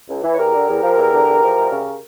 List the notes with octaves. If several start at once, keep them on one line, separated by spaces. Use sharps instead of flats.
C#2
E3
C#5
E2 G4 A#4
D3
E2
F3
E2
D3
E2
F3
D2
C#3